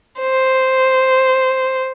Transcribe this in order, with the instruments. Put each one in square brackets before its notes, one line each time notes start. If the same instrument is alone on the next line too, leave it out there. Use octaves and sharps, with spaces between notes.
[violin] C5